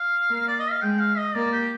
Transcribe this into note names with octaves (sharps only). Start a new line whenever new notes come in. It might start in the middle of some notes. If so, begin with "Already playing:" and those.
Already playing: F5
A#3
D5
D#5
F5
G#3 G5
F5
D#5
A#3 D5
G4